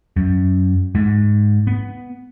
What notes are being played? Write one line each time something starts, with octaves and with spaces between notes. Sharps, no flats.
F#2
G#2
B3